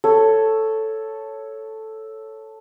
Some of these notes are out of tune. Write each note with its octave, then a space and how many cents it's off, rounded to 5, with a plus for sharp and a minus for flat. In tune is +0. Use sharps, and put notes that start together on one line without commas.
A4 +0 C#5 +0